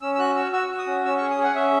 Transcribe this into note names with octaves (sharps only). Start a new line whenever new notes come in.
C#4 E6
E6
F#4 F#6
F#4 E6
F#4 E6
F#4
D#6
C#4
C#4 E6
C#6
G#4
D#6
G#4 F#5
C#4 E5